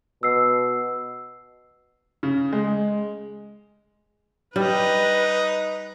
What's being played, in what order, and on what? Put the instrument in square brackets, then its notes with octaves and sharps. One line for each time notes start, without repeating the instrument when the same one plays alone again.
[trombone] B2 [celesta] E6 C7
[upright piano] C#3
G#3
[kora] G3 [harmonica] D#4 [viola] B4